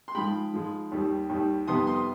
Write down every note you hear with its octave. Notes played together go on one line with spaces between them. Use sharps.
C6
G#2 F3 G#3 G5 B5
G#2 F3 G#3
D#2 D#3 G3
D#2 D#3 G3
F2 C3 D#3 G3 B3 C6 D#6
C6 D#6